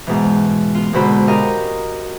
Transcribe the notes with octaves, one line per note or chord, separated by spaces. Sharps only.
G#2 B2 E3
B3 F4
G#2 B2 D3 F#4 C5 B5
F#4 G4 A#4 D#5 F5